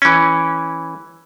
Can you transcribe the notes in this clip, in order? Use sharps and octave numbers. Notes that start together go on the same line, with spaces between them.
E3 C#4